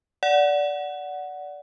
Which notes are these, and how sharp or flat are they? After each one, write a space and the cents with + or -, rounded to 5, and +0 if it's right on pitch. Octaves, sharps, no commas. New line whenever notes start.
D5 -15 F#5 +0